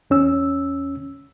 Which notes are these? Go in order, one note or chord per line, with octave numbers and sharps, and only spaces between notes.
E2 C#4 E6